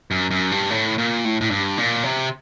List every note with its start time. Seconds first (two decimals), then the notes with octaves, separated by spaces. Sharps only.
0.11 F#2
0.31 F#2
0.51 G2
0.70 A2
0.98 A#2
1.25 A2
1.41 A2
1.50 G2
1.78 A#2
2.04 C3